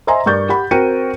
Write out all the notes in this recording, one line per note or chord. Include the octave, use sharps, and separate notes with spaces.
C5 D#5 E5 G#5 A#5 C6
G2 A#4 D5 C#6 G6 A6
G4 F#5 B5
C4 F#4 A#4 G5 C#7 D#7